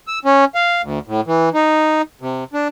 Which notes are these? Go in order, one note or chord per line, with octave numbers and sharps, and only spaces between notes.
E6
C#4
F5
D2
A2
E3
D#4
C3
D4